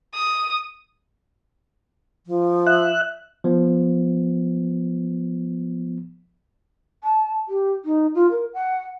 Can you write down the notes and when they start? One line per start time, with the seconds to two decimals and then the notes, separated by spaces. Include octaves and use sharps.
0.14 D#6
2.27 F3
2.67 E5 F#6
3.44 F3 B3
7.04 A5
7.48 G4
7.85 D#4
8.15 F4
8.31 A#4
8.54 F#5